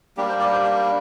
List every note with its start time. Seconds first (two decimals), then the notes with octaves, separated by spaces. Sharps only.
0.17 G3 A#3 D4 G4
0.29 C5
0.40 D5
0.52 C5
0.63 C5